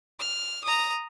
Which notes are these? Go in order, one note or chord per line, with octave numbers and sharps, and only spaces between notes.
F6
A#5 D#6